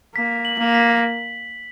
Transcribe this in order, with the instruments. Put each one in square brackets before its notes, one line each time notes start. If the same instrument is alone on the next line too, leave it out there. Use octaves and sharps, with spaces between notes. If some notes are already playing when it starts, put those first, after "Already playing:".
[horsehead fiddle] A#3 [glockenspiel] B6
[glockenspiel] F#7
[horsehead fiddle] A#3
[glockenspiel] B6